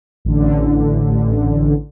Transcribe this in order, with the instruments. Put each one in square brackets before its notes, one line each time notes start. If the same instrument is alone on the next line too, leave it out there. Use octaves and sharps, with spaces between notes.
[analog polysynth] A1 D3